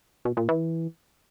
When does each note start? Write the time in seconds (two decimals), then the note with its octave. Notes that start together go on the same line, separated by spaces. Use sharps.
0.25 B2
0.37 A#2
0.49 E3